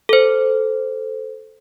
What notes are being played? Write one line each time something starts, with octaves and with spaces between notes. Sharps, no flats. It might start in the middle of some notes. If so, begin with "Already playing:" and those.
A4 C5